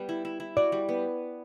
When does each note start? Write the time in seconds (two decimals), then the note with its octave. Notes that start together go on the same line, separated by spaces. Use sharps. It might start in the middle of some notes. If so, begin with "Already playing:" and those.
Already playing: G3 B3
0.09 E4
0.25 E4
0.40 E4
0.57 F#4 D5
0.72 G3
0.89 B3